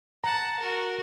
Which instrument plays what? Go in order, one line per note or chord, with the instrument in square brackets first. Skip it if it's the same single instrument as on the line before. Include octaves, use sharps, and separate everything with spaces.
[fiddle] F#5 A5 [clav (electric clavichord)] A#5
[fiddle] F#4 A#4